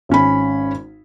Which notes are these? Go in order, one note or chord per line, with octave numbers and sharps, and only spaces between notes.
G#1 C#4 B5